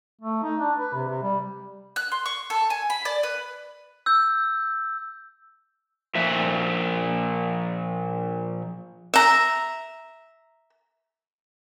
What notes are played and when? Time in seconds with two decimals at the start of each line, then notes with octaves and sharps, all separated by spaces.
0.21 A3
0.43 D#4
0.59 D4
0.78 B4
0.94 C3
1.08 C3
1.23 G3
1.96 F#6
2.12 C6
2.26 C#6
2.50 A4
2.70 G#5
2.90 B5
3.05 D5
3.23 B4
4.06 E6 G6
6.15 A#2 F3 E5
9.14 E5 A#5